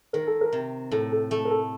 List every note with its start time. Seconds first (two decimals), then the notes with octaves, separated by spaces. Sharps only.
0.13 D#3 A#4
0.27 A4
0.41 A#4
0.53 C3
0.92 A2 A4
1.12 A4
1.31 A3 A4
1.45 A#4
1.50 A4